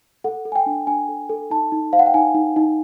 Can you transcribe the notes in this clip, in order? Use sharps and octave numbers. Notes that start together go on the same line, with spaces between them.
A4 F#5
A4
G#5
G5
D4
D4 G#5
A4
A4
D#4 A5
D#4
C5 F5
F#5
G5
D#4 G#5
D#4
D#4